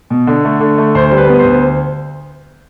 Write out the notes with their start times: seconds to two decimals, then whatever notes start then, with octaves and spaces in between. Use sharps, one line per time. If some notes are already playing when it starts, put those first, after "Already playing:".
0.10 B2
0.27 D3
0.45 A3
0.60 D3
0.78 A3
0.95 D2 C5
1.11 G3
1.18 B4
1.29 B3
1.39 C5
1.45 D2